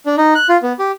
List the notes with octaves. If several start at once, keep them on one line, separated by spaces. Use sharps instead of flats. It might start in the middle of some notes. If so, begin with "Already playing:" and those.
D4
D#4
F#6
F4
B3
G4